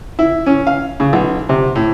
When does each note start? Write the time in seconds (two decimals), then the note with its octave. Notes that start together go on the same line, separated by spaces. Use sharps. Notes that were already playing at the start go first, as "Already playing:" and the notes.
0.19 E4
0.46 C#4
0.67 F5
1.00 C#3
1.13 B1
1.49 C3
1.76 A2